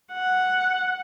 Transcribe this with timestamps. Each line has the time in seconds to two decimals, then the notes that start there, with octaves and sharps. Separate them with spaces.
0.13 F#5